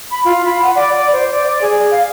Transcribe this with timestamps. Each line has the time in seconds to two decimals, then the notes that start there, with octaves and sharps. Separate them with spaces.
0.11 B5
0.25 F4
0.45 B5
0.62 F#5
0.75 D5
0.94 D5
1.13 C5
1.30 D5
1.46 D5
1.61 G#4
1.91 F5